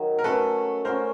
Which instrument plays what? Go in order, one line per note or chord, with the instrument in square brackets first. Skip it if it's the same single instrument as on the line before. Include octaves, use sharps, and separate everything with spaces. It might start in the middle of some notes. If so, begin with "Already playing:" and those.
Already playing: [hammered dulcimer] D#3 F#3
[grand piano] A#4
[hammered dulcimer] A3 C#4 F#4 [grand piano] A4 B4
[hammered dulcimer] A3 C#4 F#4 [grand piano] A#4 C5